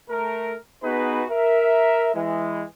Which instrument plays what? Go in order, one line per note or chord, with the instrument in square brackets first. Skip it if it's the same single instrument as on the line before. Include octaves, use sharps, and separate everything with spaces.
[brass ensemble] A3 A#4
B3 D#4 F#4 G#4 B4
A#4 E5
E3 G#3